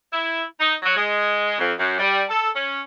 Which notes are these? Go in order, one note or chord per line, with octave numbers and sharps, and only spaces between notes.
E4
D#4
F#3
G#3
F2
F#2
G3
A4
C#4